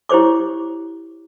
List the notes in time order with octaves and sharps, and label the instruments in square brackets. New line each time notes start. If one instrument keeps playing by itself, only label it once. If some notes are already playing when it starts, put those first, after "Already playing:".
[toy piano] E4 G4 C5 C#5 D6